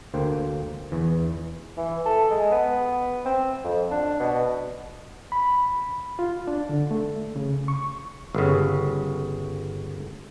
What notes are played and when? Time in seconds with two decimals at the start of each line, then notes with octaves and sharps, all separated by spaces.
0.14 D2 A#3 C5 G5
0.92 E2 E3
1.77 E3
2.06 A4
2.31 G#3
2.51 B3
3.25 C4
3.65 F2
3.91 D4
4.20 B2
5.32 B5
6.19 F4
6.47 D4
6.69 D3
6.91 A3
7.36 C#3
7.68 C#6
8.35 G1 C#3